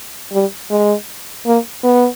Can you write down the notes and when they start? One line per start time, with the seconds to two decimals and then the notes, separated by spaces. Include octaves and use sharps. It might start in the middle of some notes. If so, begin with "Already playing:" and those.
0.33 G3
0.71 G#3
1.46 A#3
1.83 B3